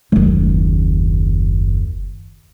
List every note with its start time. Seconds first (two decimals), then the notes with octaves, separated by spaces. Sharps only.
0.12 F#1 D#2